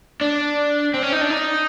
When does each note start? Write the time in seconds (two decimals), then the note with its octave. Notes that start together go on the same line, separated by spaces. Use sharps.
0.21 D4
0.94 C4
1.03 C#4
1.12 D#4
1.21 D4
1.30 D#4